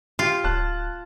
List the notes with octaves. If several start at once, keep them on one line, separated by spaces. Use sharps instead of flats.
F4 G4
D1 A5 F#6